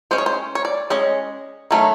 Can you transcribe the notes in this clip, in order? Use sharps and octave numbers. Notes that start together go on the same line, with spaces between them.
G#3 C#4 C5
C#5
C5
C#5
D5
G#3 C#4 D#5
D#3 F#3 A3 C#4